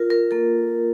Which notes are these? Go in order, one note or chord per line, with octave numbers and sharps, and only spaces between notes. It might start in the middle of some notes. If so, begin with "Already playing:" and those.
Already playing: F4 A#4
A#4
A#3 A4